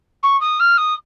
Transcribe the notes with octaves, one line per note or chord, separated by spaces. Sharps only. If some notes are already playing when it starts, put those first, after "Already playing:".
C#6
D#6
F6
D#6